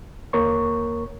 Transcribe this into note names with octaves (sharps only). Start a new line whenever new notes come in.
D#2 A#3 A#4 C#5 C#6